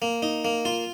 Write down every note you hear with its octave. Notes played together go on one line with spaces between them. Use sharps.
A#3
D#4
A#3
F4